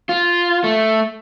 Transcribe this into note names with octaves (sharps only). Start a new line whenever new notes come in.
F4
A3